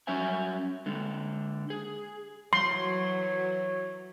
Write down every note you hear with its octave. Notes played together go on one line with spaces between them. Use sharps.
F#3 C#4 C#5 E5 G#5
D3 G#3
G#4
E3 F#3 C#5 C6